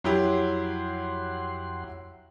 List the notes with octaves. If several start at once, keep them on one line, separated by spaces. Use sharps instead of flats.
F2 F#3 E4 G4 F#5 C6